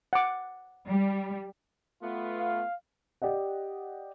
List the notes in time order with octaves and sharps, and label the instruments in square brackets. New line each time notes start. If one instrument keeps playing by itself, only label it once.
[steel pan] F#5 D6
[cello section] G3
[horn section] A3 B3 F4
[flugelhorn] F5
[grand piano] G4 D5 D#5 F#5